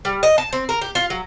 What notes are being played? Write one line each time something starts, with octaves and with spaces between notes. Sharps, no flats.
G3
D#5
A5
C4
A#4
G4
F4
F#3